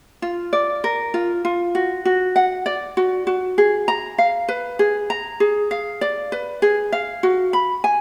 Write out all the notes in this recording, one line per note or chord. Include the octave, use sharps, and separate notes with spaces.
F4
D5
A#4
F4
F4
F#4
F#4
F#5
D5
F#4
F#4
G#4
A#5
F5
B4
G#4
A#5
G#4
F5
D5
B4
G#4
F5
F#4
B5
G#5